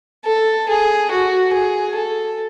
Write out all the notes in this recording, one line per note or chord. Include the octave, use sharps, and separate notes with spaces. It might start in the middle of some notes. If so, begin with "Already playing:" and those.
A4
G#4
F#4
G#4
A4